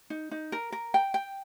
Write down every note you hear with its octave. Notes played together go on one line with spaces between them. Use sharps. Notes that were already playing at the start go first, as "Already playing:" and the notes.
D#4
D#4
A#4
A#4
G5
G5